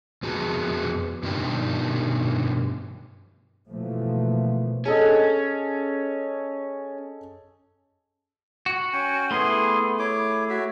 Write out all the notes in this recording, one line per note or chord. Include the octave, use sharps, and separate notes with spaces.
F2 B3 F#4 G#4 A#5
G2 B2 D#3 D4 G4
B2 D3 E3 F3 A3 A#3
C#4 G#4 A4 D#5
F#4
C#4 G5 G#5
A3 B3 E4 G#4 C6
E4 C#5 D6
F#4 C#5 E5